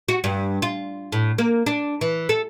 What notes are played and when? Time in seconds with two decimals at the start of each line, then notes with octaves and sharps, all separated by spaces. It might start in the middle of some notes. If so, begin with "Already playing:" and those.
0.08 F#4
0.24 G2
0.62 F4
1.12 A2
1.38 A#3
1.66 D4
2.01 E3
2.29 A4